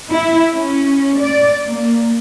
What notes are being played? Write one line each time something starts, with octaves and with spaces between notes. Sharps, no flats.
E4
C#4
D5
A#3